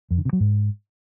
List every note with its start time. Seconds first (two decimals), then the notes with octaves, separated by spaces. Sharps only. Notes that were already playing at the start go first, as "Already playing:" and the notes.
0.11 F2
0.18 D3
0.25 C3
0.33 F#3
0.40 G#2